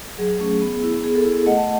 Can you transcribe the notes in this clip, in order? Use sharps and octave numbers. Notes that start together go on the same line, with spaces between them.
F#3 G#4
A3 C#4
B3
E4
B3 G#4
A4
E4 G#4
A3 D#5 F#5
F#5 A5